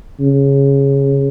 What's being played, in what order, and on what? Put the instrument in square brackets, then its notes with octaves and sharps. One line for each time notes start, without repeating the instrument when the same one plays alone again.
[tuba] C#3